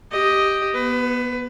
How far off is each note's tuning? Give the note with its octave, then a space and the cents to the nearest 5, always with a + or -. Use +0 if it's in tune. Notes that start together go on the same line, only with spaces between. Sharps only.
G4 +0 D#5 +5
B3 -20 B4 +25